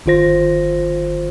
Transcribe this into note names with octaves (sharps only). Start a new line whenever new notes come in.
G1 D#3 F4 C5 A#6